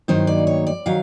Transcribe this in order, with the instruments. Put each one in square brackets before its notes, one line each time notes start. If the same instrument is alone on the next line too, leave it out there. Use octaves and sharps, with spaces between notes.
[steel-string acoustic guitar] G2 D#3 F#3 A#3 D#4 C5
D5
C#5
D5
D#3 F#3 F5